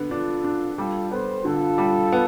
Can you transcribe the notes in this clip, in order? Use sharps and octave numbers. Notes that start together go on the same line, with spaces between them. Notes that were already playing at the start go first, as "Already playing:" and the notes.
Already playing: D3 B3
D4 F4 A4
D4
G3 F4 A4
B3 A4 C5
D3 F4 A4
G3
B3